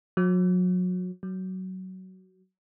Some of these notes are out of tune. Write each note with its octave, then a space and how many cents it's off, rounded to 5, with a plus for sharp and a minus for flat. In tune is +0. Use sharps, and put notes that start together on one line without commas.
F#3 -30
F#3 +15